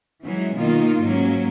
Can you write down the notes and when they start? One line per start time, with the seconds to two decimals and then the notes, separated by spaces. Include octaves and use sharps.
0.23 E3 F#3 G#3 C#4
0.56 B2 D#3 A#3 D#4 F4
1.02 G#2 F#3 A#3 C#4